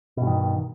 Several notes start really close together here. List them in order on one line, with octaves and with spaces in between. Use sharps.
B2 G2 D#3